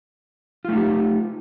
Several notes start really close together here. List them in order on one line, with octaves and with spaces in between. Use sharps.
F4 A3 D#4 G4